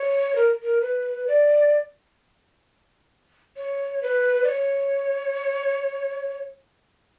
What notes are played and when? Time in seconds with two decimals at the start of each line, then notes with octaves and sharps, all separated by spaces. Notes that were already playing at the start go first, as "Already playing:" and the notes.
Already playing: C#5
0.36 A#4
0.63 A#4
0.82 B4
1.27 D5
3.57 C#5
4.03 B4
4.44 D5
4.48 C#5